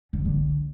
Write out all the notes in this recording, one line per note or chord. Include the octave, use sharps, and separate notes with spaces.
D3
C#3
D3